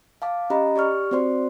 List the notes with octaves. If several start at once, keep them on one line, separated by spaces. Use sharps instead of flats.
F5 A5 D6
C#4 G4 D#5 A#5 B5
G4 D5 C#6 F6
C4 F#4 C5 D5 C6